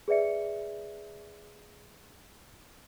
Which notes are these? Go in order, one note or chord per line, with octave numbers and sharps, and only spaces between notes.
G#4 B4 D5 E5 C#7